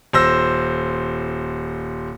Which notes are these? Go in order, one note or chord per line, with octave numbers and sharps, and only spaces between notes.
D#1 C5 E6 A#6